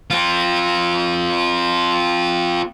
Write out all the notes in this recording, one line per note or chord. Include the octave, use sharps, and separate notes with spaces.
C4 F4